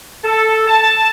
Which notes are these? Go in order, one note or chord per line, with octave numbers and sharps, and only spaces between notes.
A4
A5